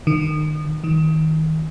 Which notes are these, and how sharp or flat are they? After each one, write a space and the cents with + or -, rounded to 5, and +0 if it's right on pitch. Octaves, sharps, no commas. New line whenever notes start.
D#3 -35
D#3 +25